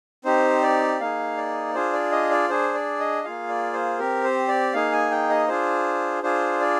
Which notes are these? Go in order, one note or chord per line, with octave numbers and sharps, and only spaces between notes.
C4 D#4 G4 C5
D5
A#3 D#4 G#4 F5
D5
D4 F4 G#4 C5
D5
D#5
D5
D4 G#4 C5
D5
D#5
A#3 F4 G#4 F5
D5
C5
C4 G4 A#4
C5
D5
A#3 D#4 G#4 F5
G#5
G5
D#5
D4 F4 G#4 C5
D4 F4 G#4 C5
D5